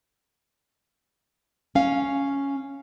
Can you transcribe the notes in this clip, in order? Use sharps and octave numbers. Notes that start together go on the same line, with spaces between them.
C#4 F5